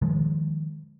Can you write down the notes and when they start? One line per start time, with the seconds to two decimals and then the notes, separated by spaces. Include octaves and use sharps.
0.02 D#3 F3 G#3